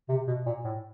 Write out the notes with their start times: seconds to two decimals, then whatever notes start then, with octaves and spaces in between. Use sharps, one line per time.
0.09 C3
0.27 B2
0.46 A#2
0.64 A2